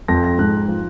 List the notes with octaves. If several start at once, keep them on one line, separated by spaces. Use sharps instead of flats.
F2 A#6
A#6
G#2 F#6
F3